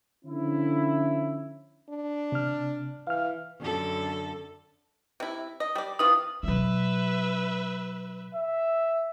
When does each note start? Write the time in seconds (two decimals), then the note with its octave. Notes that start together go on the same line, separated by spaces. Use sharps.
0.25 D3 F3 C#4 E4
1.90 D4
2.32 C3 F6
3.07 E3 F5 F6
3.60 F#2 D3 A4
5.20 C3 E4
5.60 D#5
5.75 G3 D5
5.99 C3 E3 F4 D#6
6.43 B2 F#3 B4 E5
8.35 E5